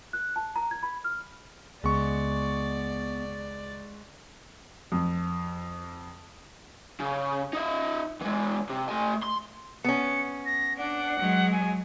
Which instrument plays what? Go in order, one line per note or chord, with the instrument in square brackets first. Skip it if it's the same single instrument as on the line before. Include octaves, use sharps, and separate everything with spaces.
[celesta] F#6
A5
A#5
G#6
B5
F6
[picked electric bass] C#2 [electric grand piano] G#3 C#6 [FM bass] B3 [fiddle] D5
[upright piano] F2
[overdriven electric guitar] C#3
D#4 E5
E3 G#3
C3
A3 G#5
C6
[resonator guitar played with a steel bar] B3 C#4 [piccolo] C#7
[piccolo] A#6
[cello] D4 [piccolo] F#5
[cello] F#3 G#3
[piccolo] G#5